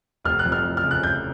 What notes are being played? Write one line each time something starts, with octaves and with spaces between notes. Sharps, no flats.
F1 F6
F#6
F2
F6
F1
F6
C#3
F#6
F1 G6